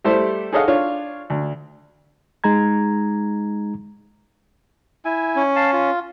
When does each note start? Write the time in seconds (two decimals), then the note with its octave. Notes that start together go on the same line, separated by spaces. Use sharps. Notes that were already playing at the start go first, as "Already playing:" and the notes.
0.04 G3 A3 E4 G4 A4 C5
0.53 G#4 A4 C#5 D#5 F5 F#5
0.68 D4 F4 C#5
1.30 D2
2.44 G#3 D#4 A#5 G#6
5.05 E4 G#5
5.36 C#4
5.56 F5 A5
5.73 F4